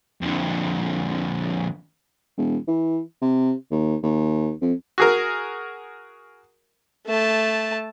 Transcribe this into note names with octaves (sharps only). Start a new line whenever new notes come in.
F2 D3
E1
E3
C3
D#2
D#2
F2
F#4 G#4 A#4
A3 A5